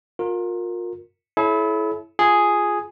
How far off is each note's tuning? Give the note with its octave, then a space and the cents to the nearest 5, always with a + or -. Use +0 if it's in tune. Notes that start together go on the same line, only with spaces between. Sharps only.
F4 +35 A#4 -10
E4 +0 A4 -45 C#5 +0
F4 +0 G#4 +0